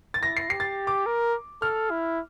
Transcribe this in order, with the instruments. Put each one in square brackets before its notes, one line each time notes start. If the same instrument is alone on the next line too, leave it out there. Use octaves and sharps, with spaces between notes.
[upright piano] A6
[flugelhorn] E4 [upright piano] A#6
[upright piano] C7
[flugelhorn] G4 [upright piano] C7
[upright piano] A6
D6
[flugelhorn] A#4
[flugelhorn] A4 [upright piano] F6
[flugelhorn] E4